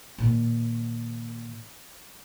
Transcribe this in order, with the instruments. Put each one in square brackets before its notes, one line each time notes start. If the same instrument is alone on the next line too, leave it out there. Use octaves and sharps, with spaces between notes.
[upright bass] A#2 D#3